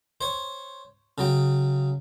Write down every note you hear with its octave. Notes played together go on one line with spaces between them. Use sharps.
C5 C#5
C#3 F#3 G5